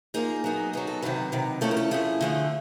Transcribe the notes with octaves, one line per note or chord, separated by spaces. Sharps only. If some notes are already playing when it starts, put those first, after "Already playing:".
F3 A#3 D#4 G#4
F#3 B3 D#4
F#3 B3 D#4 G#4
A4
C3 D#3 F#3 B4
C3 D#3 F#3
F3 A3 C#4 E4 A4
A#4
A4
F3 A3 C#4 E4 G#4
D3 F3 A3